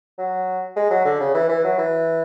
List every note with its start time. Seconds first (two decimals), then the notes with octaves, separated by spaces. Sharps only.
0.18 F#3
0.76 G#3
0.91 F#3
1.05 D3
1.20 C#3
1.35 E3
1.49 E3
1.64 F#3
1.78 E3